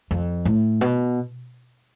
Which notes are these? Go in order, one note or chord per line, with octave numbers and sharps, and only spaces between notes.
F2
A2
B2